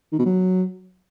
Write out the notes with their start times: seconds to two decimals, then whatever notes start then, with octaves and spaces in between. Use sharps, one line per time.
0.12 D#3
0.19 B2
0.25 F#3